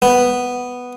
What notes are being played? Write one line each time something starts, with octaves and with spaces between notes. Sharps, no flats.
B3